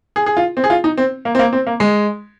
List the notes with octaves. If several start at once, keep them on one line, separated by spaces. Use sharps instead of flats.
G#4
G#4
F4
C4
G#4
F4
D#4
C4
A#3
C4
A#3
C4
A#3
G#3